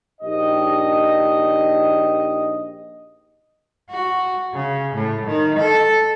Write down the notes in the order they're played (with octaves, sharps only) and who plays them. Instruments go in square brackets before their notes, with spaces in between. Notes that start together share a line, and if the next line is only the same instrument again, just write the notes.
[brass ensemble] A#1 D4 D#4 G4 D#5
[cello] F#4
C#3
A2
D#3
A4